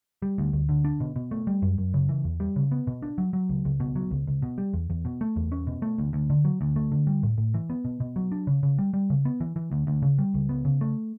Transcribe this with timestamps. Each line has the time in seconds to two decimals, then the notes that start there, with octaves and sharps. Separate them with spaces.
0.22 G3
0.38 D2
0.53 D2
0.69 D3
0.85 D4
1.00 B2
1.16 B2
1.31 A3
1.47 G3
1.62 F#2
1.78 F#2
1.94 C#3
2.09 E3
2.25 E2
2.40 G3
2.56 C#3
2.71 B3
2.87 B2
3.02 D4
3.18 F#3
3.33 F#3
3.49 C#2
3.65 C#2
3.80 B2
3.96 F#3
4.11 C#2
4.27 C#2
4.42 B2
4.58 G3
4.74 E2
4.90 E2
5.05 B2
5.21 A3
5.36 E2
5.52 C#4
5.67 B2
5.82 A3
5.98 D2
6.13 D2
6.30 D3
6.45 F#3
6.61 D2
6.76 A3
6.92 D3
7.07 G3
7.23 A2
7.38 A2
7.54 E3
7.70 B3
7.85 B2
8.00 B2
8.16 F#3
8.32 D4
8.47 C#3
8.63 C#3
8.78 G3
8.94 G3
9.10 C#3
9.25 B3
9.41 E3
9.56 E3
9.72 D2
9.87 D2
10.02 C#3
10.19 G3
10.34 C#2
10.49 B3
10.65 C#3
10.81 A3